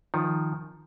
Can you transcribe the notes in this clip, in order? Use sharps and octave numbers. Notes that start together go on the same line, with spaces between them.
D#3 F3